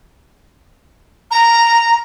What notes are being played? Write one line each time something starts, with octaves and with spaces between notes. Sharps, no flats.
A#5